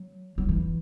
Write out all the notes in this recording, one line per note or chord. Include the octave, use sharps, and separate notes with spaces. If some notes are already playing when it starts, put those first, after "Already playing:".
Already playing: F#3
F#3
E3